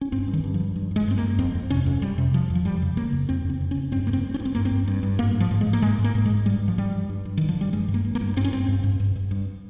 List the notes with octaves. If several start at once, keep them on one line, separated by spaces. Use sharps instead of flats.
C#4
G2 C4
G2
D#3
G2
F3
G2
G2
G2 G#3
G2 C4
A#3
G2
F2 C4
F2
C3 C#4
F2
F2 G3
C3
F2 F3
F2
F3
F2 G3
C#3
C#3 A#3
F2
F2 C4
F2
C4
C#3
C#4
F2
G2 C4
G2 A#3
C4
G2
C#4
G2
C4
G2 A#3
C4
G2
G2
G2
G#2 A#3
G#2
F3
G#2
G#3
G#2
A#3
G#2 G#3
G#2
A#3
G#2
G#3
G#2
G2 G3
G2
F3
G2 G3
G2
G2
G2
G2 D#3
F3
G2 G3
G2 G#3
G2
A#3
G2
A#3
G2
G2 C4
C#4
G2 C4
G2
G2
G2
G2
G2